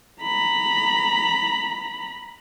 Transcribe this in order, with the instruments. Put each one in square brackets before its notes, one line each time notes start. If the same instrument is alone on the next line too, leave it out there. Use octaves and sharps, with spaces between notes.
[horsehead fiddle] A#5 B5